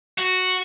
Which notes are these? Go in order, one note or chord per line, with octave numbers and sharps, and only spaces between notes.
F#4